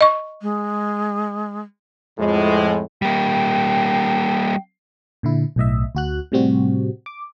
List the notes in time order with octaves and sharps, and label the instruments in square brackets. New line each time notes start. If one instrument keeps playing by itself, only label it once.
[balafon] D#5 C#6
[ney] G#3
[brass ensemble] F2 A2 G#3
[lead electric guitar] G3 A#3 [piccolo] G5
[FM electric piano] A#2 D3 E4
B1 A2 D#5 E5
D2 F#4 F#6
A2 C3 G3 C4 F#4
D6